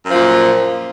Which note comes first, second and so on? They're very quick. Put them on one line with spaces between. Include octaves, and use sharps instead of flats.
F#2 F3 A#2